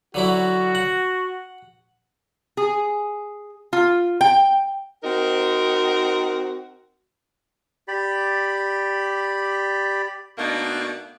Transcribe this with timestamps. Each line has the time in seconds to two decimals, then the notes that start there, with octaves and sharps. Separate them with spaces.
0.14 D3 F#3 E4 F#4
0.75 F#5
2.57 G#4
3.73 F4
4.21 G5
5.04 C4 D#4 F#4 A#4
7.88 G4 D5 B5
10.38 B2 A3 A#3 D4 D#4